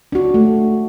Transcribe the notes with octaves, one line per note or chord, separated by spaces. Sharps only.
D4 F#4
A3